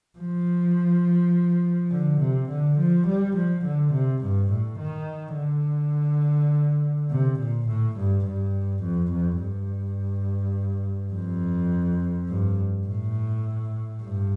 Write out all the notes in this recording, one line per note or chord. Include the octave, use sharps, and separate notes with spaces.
F3
D3
C3
D3
F3
G3
F3
D3
C3
G2
A2
D#3
D3
C3
A#2
A2
G2
G2
F2
F2
G2
F2
G2
A2
G2